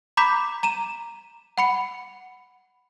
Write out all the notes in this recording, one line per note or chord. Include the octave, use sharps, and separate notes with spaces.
A#5 B5 D6 G6 B6
A#5 D#7 E7
F#5 B5 C#7